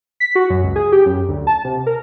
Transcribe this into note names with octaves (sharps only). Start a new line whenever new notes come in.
B6
F#4
F#2
C#2
G#4
G4
F#2
D2
A5
C3
A#4